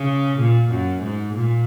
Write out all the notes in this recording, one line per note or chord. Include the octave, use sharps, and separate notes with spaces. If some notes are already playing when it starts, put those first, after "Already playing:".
Already playing: C#3
A#2
F#2
G#2
A#2